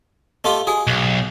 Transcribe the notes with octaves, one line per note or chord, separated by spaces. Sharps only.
A3 F4 G4 D#5 A5
F#4 G#4 G#5
B1